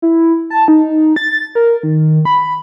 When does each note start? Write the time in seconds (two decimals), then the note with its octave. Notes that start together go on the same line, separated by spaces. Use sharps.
0.02 E4
0.50 A5
0.68 D#4
1.16 A6
1.55 A#4
1.83 D#3
2.25 B5